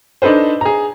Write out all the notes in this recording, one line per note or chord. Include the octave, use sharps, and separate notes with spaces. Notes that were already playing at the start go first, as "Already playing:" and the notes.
D4 D#4 A4 B4 C5
G#4 A#5